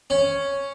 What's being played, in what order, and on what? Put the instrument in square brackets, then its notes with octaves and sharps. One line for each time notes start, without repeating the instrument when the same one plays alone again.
[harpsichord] C#4